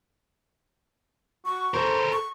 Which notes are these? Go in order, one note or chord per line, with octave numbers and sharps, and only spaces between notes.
F#4 C#6
A4 A#4 C5
C#6